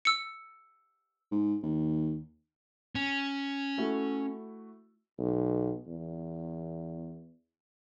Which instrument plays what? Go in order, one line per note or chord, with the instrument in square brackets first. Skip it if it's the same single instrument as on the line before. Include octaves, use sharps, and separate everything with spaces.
[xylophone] E6 C#7
[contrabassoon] G#2
D#2
[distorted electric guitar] C#4
[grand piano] A3 E4 F#4
[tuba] B1
E2